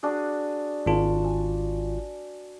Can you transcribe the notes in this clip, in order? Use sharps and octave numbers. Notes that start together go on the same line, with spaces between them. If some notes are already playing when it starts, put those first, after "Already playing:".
D4 F#4 G#4
G#1 F4 A5
G#5